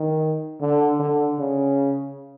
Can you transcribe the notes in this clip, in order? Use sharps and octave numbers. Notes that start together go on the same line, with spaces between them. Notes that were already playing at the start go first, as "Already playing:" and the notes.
Already playing: D#3
D3
D3
C#3